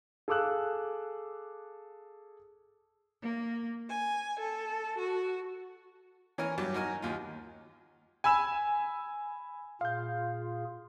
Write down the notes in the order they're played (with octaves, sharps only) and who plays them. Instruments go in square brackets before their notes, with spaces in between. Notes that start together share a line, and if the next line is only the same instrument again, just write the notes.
[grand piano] G#4 A4 F5 D6 E6 F#6
[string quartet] A#3
G#5
A4
F#4
[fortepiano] E3 C#4 A#4 G#5
G2 F#3 G4
D#4 F#4 A#4 G#5
D#2 F4
[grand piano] G#5 B5 E6 E7
[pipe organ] A#2 F4 G#4 [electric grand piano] F5 G6